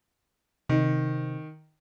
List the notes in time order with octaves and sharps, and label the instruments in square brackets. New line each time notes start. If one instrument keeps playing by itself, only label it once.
[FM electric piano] C3 [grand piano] D#3